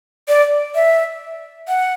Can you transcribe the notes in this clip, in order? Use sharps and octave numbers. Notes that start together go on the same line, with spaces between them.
D5
E5
F#5